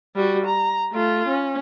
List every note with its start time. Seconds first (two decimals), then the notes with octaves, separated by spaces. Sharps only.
0.16 G3 F#4
0.47 A#5
0.92 A3 F4
1.28 C#4